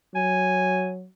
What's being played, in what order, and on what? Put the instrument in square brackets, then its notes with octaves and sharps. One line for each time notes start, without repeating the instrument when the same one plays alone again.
[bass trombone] F#3 [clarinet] G#5